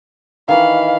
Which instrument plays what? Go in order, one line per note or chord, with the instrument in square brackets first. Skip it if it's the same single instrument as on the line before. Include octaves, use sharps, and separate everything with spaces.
[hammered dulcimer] D#3 E3 B5 [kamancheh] F5